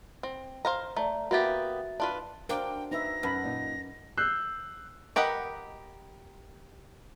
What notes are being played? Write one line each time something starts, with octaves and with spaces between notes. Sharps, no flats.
C4
C5 F5 A#5
A3 D5 A#5
A#3 B3 F#4 G4 E5 A6
D4 F4 B4
D4 F#4 A#4 C5 F5 G5 D6
D#4 B4 E5 A#6
F#2 B4 A5 B5
A#2 D#4
E6 F#6 G6 C7
G4 A#4 B4 D#5 F#5